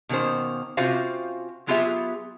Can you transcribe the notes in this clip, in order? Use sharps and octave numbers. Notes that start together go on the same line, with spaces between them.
B2 D#3 A#3 C#4 C5
C3 C#4 F4 F#4 C5 F5
F#3 B3 F4 G4 G#4 E5